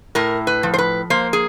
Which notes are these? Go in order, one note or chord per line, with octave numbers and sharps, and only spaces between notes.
A2 A#4
B4
F3
C5
B4
A#3 C5
G#4